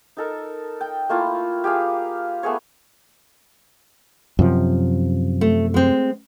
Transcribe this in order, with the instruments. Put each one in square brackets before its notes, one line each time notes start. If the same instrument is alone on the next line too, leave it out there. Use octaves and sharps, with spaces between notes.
[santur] D#4 A4 A#4
G5
A3 A#3 E4 F4
G4 G#4 F5
A3 B3 G#4 C#5
[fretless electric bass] F#2 C3 F3
[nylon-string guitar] A3
G#3 C4